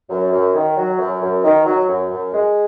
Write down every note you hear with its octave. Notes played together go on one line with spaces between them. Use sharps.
F#2
F#2
D#3
F#3
F#2
F#2
D#3
F#3
F#2
F#2
G#3